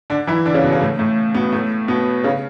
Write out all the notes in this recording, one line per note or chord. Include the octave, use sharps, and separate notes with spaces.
D3 D4
E3 E4
D3 D4
C#3 C#4
B2 B3
C#3 C#4
A2 A3
A2 A3
B2 B3
A2 A3
B2 B3
C#3 C#4